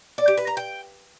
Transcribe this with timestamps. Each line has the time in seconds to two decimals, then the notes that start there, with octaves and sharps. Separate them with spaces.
0.18 D5
0.28 G4
0.37 B4
0.47 A#5
0.57 G5